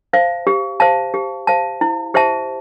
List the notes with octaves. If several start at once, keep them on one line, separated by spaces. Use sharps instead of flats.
C5 F5 A5
G4
C5 F5 A5
G4
C5 F5 A5
E4
G4 C5 E5 A5